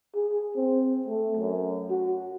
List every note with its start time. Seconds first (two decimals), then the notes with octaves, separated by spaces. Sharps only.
0.15 G#4
0.56 C4
1.08 A3
1.37 F#2
1.90 F#4